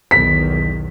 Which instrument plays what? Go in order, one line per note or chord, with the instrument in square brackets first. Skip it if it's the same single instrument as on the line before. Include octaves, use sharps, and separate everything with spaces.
[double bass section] B1 E2 D#3 [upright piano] B6